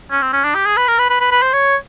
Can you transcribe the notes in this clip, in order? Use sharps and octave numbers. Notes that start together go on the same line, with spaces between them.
C#4
C4
C#4
D4
G4
G#4
B4
A#4
B4
B4
B4
B4
C5
C#5